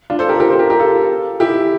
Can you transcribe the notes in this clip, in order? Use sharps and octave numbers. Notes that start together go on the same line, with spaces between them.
D4 F4
A4 C5
G4 A#4
G4 A#4
A4 C5
G4 A#4
G4 A#4
F4 A4
E4 G4